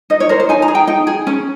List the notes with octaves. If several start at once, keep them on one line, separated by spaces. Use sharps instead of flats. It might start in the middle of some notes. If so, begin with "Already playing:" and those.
D#4 D#5
C#5
A#4 C5
C5
D#4 G#5
A#5
G#4
G5
D#4 G5
G#4
C#4